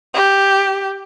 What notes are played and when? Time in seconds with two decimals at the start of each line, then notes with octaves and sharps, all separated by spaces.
0.14 G4